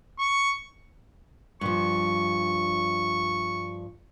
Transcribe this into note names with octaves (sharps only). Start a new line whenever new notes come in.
C#6
G2 F3 C#6